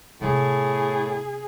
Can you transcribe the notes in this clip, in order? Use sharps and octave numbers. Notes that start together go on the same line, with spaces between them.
A2 C3 B3 G#4